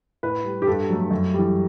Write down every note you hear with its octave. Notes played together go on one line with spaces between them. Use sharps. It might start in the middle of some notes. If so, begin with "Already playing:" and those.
A2 B4
G3
G4
G2 A4
F#3 A3
F#2
E3 G3